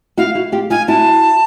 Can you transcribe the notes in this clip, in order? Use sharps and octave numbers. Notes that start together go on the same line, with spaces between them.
E4 F#4 F5
E4 F#4
F4 G4
D#4 F4 G#5
E4 F#4 A5